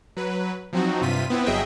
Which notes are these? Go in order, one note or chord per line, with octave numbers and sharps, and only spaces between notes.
F#3 B4
F3 F#3 C4 D#4 F#4
G2 C3 F4 B6 D#7
B3 C4 E4 B4
G1 F#3 G#4 D#5 E5 G5